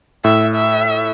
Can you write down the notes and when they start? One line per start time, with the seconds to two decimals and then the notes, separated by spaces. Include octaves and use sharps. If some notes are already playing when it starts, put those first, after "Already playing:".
0.24 A2 E5
0.55 E5